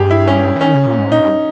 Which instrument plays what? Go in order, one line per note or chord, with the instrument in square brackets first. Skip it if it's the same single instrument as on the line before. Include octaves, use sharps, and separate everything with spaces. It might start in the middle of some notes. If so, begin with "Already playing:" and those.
Already playing: [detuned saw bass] G2 [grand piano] G4 G#4
[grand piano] E4
C#4
[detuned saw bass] E3
[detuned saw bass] D#3 [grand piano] C#4
[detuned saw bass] C#3
A#2
G#2
[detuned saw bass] A#2 [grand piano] D#4
[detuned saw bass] G2